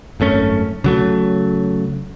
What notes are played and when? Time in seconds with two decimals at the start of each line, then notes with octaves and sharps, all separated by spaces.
0.20 G#1 F#2 A3 C#4
0.84 C#3 F#3 A3